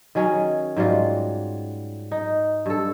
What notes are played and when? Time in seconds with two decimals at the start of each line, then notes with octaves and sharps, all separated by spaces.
0.15 D#3 F#3 C#4 G#4
0.76 G#2 F#3 G3 F4
2.12 D#4
2.66 G2 A4